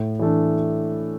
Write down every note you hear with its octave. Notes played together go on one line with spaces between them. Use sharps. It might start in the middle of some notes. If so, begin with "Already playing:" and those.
Already playing: A2
E3 A3 D4